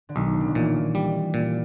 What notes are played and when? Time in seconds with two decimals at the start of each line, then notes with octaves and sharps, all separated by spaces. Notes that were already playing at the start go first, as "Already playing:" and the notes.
0.09 D3
0.16 B1 D#3
0.33 C#3
0.41 D3
0.48 D#3
0.55 A#2 E3
0.95 G3
1.34 A#2